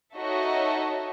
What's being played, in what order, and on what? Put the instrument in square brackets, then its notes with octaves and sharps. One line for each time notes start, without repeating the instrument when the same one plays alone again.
[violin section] D#4 F#4 A4 C#5 D#5 E5